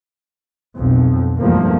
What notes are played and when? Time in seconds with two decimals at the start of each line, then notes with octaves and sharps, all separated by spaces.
0.78 B1 F2
1.39 E2 G2 F3 A3 A#3